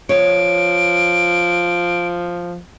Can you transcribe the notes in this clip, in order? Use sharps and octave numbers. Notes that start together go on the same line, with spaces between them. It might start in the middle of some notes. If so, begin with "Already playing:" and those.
F3 C#5 D7